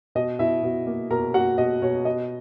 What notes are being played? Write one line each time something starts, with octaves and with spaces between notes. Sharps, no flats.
B2 D#5
B2 E4 E5
B2
A#3
B2 A#4 A#5
A#3 F#4 F#5
B2 D#5
B2 C#5
B3 D#5